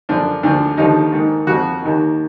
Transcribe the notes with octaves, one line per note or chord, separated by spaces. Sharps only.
F#2 D3 F3 D4
D2 D3 F3 D4
D#2 D3 F3 D#4
G#2 D#3
F2 F3 F#4
D#2 D#3